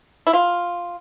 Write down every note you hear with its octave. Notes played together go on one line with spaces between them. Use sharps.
E4
F4